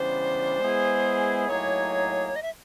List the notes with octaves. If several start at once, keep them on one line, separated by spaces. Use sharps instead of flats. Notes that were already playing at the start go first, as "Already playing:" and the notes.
Already playing: C#3 E3 G3 B3 D4 C5
G#3 B3 E4 G#4
A2 F#3 A#3 D#4 G#4 C#5
D#5
E5